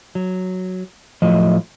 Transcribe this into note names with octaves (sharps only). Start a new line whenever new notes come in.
F#3
A2 F3 F#3 A3 D#5